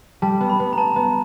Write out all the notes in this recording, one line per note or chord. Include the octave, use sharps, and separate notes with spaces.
G3 A5
B3
B5
B3
A#5
B3 A5
B3